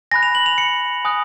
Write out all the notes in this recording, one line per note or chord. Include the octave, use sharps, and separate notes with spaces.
G#5 B5 F#6 A#6
F7
F#7
F7
C#7
G#5 D#6 F#6